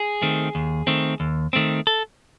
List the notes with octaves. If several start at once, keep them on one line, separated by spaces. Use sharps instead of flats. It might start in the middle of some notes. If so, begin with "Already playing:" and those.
Already playing: G#4
D#3 A3 C4
D#2
D#3 A3 C4
D#2
D#3 A3 C4
A4